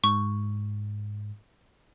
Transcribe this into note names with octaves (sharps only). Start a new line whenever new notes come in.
G#2 C#6